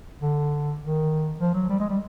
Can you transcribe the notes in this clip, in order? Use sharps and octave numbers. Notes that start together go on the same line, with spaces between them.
D3
D#3
F3
F#3
G3
G#3
G3